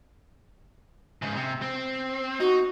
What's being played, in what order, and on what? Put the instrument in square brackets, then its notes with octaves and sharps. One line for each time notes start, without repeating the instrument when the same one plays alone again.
[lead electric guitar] G#2 C#3
C3
C4
[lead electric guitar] D#4 [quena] F#4